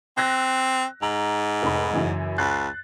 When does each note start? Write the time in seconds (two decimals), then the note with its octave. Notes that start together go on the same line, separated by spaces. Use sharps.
0.17 C4 E6 F#6 A#6
1.02 G#2 A#5
1.62 F1 D#4 B5
1.93 F#2 C#3 E3
2.38 C#2 F#6 A6 C7